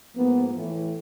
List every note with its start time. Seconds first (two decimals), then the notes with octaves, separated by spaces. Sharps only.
0.15 G#2 F3 A#3 B3
0.53 A2 E3 A3